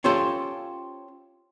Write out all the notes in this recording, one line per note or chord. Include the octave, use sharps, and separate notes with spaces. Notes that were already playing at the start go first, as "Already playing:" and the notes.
C#4 F4 G4 A4 C5